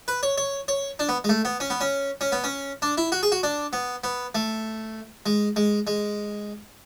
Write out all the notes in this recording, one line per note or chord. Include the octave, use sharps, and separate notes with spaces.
B4
C#5
C#5
C#5
D4
B3
G#3
A3
B3
C#4
B3
C#4
C#4
B3
C#4
D4
E4
F#4
G#4
F#4
D4
B3
B3
A3
G#3
G#3
G#3